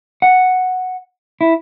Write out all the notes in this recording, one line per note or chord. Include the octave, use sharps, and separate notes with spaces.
F#5
E4